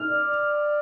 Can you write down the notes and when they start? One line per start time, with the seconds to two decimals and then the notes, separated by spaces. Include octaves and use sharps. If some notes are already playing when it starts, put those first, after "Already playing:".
Already playing: F6
0.09 D5